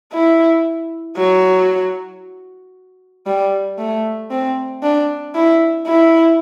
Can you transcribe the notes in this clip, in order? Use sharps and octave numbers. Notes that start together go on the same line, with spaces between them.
E4
F#3
G3
A3
C4
D4
E4
E4